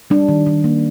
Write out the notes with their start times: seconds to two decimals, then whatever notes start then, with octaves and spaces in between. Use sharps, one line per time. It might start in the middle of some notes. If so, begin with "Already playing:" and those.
0.10 G3 D4
0.29 D#3
0.47 D#3
0.64 A#3